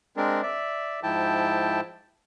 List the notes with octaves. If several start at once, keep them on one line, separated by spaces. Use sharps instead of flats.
G#3 C4 D4 A#4
D5 E5
G#2 F3 E4 G5 A5